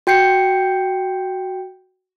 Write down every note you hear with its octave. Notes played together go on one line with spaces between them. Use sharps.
F#4 G5 G6 C7 C#7